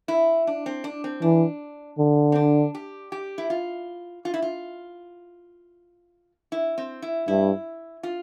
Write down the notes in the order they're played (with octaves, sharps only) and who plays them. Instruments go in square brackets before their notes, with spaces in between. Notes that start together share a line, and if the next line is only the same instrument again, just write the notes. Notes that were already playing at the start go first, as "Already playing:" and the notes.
[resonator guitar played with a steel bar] E4
D4
C4
D4
C4
[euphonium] E3 [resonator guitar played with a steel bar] D4
[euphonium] D3
[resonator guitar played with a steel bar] C4
D4
G4
G4
E4
F4
F4
E4
F4
E4
C4
E4
[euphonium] G2 [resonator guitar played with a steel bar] E4
[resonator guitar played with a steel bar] F4